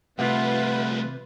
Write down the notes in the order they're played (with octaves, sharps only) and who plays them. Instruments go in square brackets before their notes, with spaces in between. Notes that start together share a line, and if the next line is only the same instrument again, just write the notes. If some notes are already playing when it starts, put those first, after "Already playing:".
[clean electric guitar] C3 [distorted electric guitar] G3 A3 [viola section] F4 B4 [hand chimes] E5 F#5